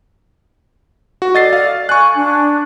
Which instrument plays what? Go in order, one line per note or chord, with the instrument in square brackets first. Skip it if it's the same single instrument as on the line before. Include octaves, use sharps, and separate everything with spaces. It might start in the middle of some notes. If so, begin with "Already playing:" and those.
[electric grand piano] F#4
[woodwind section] A4 D5 [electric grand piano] D#5 A6 C7
[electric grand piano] F5
[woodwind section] G#5 [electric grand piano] C#6 F#6
[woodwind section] D4